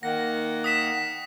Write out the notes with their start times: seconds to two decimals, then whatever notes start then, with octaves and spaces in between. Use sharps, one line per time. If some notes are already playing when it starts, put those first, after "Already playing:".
0.03 D#3 A#3 F#5 A#6
0.64 D#6 B6 E7